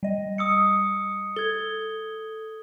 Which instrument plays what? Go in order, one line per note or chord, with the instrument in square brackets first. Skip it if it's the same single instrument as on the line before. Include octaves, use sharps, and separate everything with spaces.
[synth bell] G3 D#5
[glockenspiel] D#6 E6 C#7
[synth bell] A4 [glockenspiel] G#6 G7